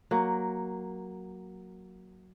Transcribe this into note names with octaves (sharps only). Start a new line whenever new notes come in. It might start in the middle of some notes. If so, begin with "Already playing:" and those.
F#3 A#3